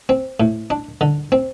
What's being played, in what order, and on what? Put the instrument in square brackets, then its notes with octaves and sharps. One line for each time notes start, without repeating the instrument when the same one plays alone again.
[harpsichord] C4
A2
D4
D3
C4